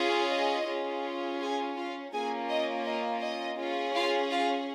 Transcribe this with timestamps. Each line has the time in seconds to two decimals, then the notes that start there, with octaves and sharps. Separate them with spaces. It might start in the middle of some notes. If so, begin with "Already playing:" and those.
Already playing: C#4 F4 G#4
0.31 D#5
0.67 C#4 F4 G#4
1.40 G#4 G#5
1.76 F4 F5
2.12 A#3 C#4 F4 G#4 G#5
2.49 D#5
2.86 D#5
3.21 D#5
3.57 C#4 F4 G#4
3.94 F4 F5
4.30 F4 F5